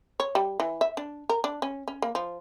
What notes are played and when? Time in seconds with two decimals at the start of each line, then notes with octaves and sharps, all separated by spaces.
0.20 C#5
0.35 G3
0.60 E3
0.81 E5
0.97 D4
1.29 A#4
1.44 D4
1.62 C#4
1.88 C#4
2.02 A#3
2.15 F3